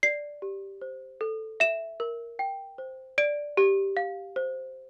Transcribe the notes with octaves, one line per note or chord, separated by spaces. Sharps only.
D5 C7
G4
C5
A4
E5 E7
A#4
G5
C5
D5 D7
G4
F5
C5